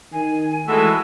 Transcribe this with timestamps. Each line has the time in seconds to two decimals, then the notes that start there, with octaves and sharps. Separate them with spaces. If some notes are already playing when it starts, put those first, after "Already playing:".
0.13 D#3 G#5
0.68 E3 G#3 A3 B3 F#4 A4 E5 E6